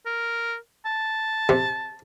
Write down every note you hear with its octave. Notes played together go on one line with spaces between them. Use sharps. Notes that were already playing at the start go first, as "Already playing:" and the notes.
A#4
A5
C3